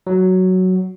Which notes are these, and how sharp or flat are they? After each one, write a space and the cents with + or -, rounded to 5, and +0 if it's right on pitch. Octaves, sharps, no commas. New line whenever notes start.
F#3 +5